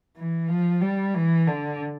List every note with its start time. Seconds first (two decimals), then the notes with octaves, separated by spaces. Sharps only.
0.16 E3
0.49 F3
0.81 G3
1.15 E3
1.47 D3